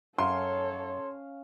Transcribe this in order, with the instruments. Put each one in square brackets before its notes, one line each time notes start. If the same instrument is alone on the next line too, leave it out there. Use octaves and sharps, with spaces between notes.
[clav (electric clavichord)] F#2 [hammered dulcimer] C#4 F5 C#6 [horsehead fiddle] A4 C#5 [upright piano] C6